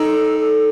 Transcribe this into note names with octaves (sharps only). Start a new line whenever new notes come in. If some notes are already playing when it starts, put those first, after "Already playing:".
Already playing: D#3 D#4 A4
A4